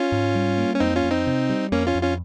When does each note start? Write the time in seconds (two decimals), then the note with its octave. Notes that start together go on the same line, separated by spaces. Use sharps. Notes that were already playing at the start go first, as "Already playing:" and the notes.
Already playing: C#4 F4
0.12 G#2
0.35 G3
0.58 A#3
0.75 C#4
0.80 F2 C4 D#4
0.96 C#4 F4
1.04 F2
1.11 C4 D#4
1.27 C3
1.50 G3
1.72 F2 A#3 C#4
1.87 C#4 F4
1.95 F2
2.03 C#4 F4